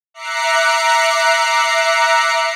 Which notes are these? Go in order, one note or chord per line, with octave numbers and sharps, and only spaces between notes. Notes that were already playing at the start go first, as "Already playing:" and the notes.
E5 A#5 D6 F#6 C7 C#7